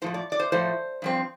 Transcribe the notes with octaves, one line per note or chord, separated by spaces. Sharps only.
A2 F3 A3 C5
D5
D5
C5
A2 F3 A3 C5
G2 F3 C4